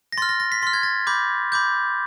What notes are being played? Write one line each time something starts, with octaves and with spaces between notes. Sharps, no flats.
A#6
C6 F6 A6
A#6
A#6
B6
C6 F6 A6
G#6
A6
B5 D6 G6
B5 D6 G6